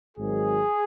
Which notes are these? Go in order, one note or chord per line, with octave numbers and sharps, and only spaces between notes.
G#1 G#2 D#3 F#3 G#4